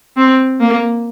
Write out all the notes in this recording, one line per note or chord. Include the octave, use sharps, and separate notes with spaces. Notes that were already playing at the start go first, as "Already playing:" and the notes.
C4
A#3